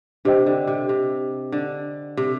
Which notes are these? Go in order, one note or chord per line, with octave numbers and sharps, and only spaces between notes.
C3 D4 G4 C5 D#5 G5
D3
C3
C3
D3
C3